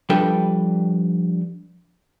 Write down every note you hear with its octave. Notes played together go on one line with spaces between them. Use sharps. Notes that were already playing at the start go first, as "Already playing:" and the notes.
F3 G3 D4 A4 B4 G5